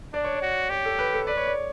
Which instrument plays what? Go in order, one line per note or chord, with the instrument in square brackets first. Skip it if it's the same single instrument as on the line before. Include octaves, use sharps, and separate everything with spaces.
[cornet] D4 [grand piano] D5
[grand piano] C#5
D5
[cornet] F#4
[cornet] G4 [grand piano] C#5
[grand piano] A4
B4
A4
[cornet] B4 [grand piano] D5
[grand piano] C#5
D5